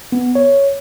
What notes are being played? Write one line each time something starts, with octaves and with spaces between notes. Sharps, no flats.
B3
C#5